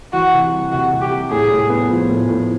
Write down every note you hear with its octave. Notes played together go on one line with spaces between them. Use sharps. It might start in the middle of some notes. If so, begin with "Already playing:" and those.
E3 F#4
C3
G3
C3 F#4
C3
G4
G3
A2 G#4
A2
B3
F3
A2
A2